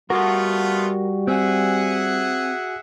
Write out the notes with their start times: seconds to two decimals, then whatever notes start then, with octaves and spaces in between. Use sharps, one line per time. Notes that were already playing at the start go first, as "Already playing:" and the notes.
0.10 G3 A3 B3 F4 F#4 A#4
1.27 C4 G#4 E5 F#5